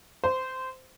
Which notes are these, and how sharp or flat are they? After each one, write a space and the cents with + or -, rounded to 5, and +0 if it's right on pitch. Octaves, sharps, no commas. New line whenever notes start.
C5 -15